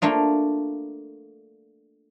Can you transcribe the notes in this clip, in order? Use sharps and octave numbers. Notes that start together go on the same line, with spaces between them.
A3 A#3 D4 F4